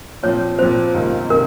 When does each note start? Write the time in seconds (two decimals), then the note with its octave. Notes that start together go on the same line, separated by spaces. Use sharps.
0.23 A#2 F3 C4 C#5
0.59 A#2 F3 C4 C5
0.95 C#2 C3 D#3 A#3
1.30 C3 D#3 A#4